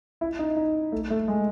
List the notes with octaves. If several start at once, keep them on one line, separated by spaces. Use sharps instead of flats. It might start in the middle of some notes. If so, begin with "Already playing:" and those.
E4
D#4
D#4
A3
A3
G#3